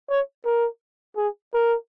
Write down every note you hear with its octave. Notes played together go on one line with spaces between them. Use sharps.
C#5
A#4
G#4
A#4